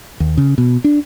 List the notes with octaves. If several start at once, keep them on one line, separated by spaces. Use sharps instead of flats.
D#2
C#3
B2
D4